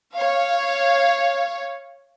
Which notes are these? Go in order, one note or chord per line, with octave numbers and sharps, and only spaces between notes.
C#5 F5